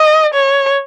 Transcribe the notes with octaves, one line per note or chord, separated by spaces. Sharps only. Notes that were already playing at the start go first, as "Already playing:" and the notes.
Already playing: D#5
C#5